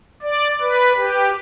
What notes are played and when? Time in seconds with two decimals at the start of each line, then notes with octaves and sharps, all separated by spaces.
0.22 D5
0.61 B4
0.96 G4